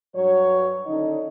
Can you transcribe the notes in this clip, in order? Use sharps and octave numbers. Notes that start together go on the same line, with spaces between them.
G2 F#3 C#5
D3 D#3 C#4 D#4 D#5